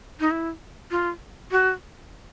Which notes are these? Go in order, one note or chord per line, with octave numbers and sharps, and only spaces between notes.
D#4
E4
F4
F#4